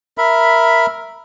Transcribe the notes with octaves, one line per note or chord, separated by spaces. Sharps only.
A#4 E5 B5